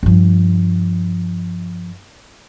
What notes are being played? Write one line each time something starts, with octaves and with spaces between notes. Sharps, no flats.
G2 F3